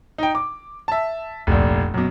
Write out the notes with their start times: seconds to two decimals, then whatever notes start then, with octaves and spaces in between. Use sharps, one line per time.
0.18 D#4 G5
0.35 D6
0.88 E5 A5
1.47 F1 A#1
1.94 F#2 B2